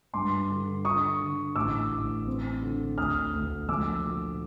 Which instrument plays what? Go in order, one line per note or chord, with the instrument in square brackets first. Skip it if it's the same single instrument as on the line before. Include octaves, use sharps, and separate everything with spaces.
[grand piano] G2 C6 D6
D3
D3 C#6 D#6
D3
A1 D6 E6
A1
C4
D3
D2 D#6 F6
D2
F3 D6 E6
A#2